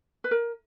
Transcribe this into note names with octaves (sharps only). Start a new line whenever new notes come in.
B4
A#4